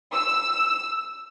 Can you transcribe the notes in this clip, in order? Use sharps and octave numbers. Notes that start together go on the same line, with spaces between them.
E6